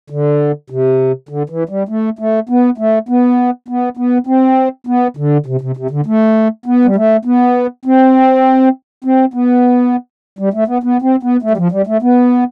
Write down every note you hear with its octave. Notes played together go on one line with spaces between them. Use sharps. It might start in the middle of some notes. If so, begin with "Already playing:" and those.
D3
C3
D3
E3
G3
A3
A3
B3
A3
B3
B3
B3
C4
B3
D3
C3
C3
C3
D3
A3
B3
G3
A3
B3
C4
C4
B3
G3
A3
B3
B3
C4
B3
A3
G3
F3
G3
A3
B3